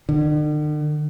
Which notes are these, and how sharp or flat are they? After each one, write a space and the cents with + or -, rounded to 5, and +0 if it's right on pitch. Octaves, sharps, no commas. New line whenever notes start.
D3 +45